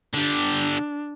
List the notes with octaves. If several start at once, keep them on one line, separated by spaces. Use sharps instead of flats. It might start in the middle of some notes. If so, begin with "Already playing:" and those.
D3 D4 G4